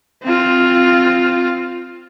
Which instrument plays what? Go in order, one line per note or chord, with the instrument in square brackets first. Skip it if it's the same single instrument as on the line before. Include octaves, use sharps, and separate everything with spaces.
[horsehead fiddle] C4 F4